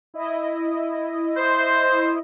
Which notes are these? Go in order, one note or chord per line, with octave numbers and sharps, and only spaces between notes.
E4 D#5
C5